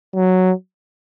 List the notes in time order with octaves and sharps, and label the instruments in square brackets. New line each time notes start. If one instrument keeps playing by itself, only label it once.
[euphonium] F#3